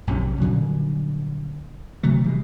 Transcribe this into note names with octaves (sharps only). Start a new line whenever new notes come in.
A#1 F#2 C3 C#4
A#2 D3 F#3 G3
C3 E3 F#3 A3
E3 G3 G#3